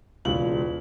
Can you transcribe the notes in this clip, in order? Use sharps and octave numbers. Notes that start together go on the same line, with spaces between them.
E1 C#2 F#7